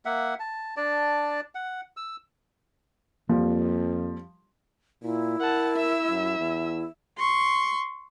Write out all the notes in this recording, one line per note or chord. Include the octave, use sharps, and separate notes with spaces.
A#3 E5 F#5
A5
D4 D5 A5
F#5
E6
F2 F3 G3 A#3
A#2 E4
A#4 F#5 A5
E5 E6
F#2
E2
C6 C#6